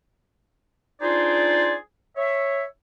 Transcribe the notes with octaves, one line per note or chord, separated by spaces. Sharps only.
D4 D#4 F4 G#4 C5 D5
C#5 E5